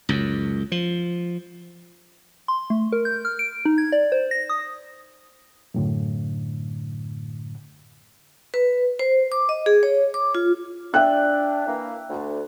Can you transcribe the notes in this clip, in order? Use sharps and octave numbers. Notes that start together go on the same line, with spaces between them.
C#2 F#2
F3
C6
A3
A#4
G6
F6
D7
D#4
G#6
D5
C5
A#6
D#6
F#2 A2 D3
B4
C5
D6
D#5
G#4
C#5
D6
F4
D4 E5 G5 F#6
E3 A#3
D2